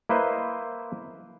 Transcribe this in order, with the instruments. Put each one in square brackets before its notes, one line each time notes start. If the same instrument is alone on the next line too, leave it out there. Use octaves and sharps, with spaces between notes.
[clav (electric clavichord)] A#3 E4 B4 C5 D#5